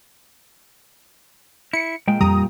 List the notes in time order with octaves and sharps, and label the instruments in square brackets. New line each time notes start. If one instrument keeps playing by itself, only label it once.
[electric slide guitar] E4 [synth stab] C#7
[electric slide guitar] A#2 G5 [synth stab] G#3
[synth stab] F2 A#5 D#6 [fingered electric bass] G3